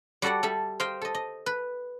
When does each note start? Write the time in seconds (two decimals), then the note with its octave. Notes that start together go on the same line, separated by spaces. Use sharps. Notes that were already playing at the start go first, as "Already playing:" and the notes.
0.22 G3 F#4 A4 D5 F#5
0.43 G3 A4 E5
0.80 C5 D#5 F5 G5
1.02 A4 D#5
1.15 D#5
1.46 B4